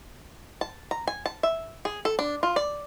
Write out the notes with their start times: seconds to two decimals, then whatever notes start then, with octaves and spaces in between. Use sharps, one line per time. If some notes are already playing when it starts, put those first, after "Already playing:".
0.61 A5
0.91 A#5
1.07 G#5
1.26 A5
1.43 E5
1.85 G#4
2.05 A4
2.19 D4
2.43 F4
2.56 D5